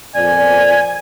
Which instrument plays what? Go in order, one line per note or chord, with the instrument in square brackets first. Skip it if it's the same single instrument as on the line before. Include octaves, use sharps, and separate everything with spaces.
[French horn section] F2 A#2 D5 [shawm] G#5